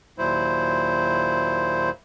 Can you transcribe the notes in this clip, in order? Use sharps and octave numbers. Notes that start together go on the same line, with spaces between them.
D#2 A#2 F#3 E4 C5